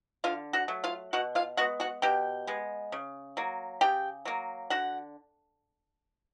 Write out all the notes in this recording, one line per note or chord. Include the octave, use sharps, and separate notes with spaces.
D3 F4 F5
F#4 F#5
F#3 A3
F4 F5
B2 F#4 F#5
F4 F5
G#3 B3 F#4 F#5
F#4 F#5
B2 G4 G5
G#3 B3
C#3
F#3 A#3
C#3 G4 G5
F#3 A#3
D3 F#4 F#5